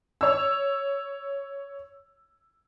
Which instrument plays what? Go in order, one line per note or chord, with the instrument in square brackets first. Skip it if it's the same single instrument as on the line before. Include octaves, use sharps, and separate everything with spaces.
[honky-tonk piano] C#5 E6